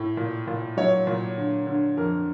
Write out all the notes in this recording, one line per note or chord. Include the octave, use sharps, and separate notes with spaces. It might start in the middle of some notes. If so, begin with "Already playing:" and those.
Already playing: A2
A#2
A#2
F#3 C#5
A#2
D3
D3
F2 A#4